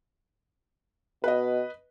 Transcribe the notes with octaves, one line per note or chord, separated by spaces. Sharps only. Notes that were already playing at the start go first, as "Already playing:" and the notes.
B2 B4 D#5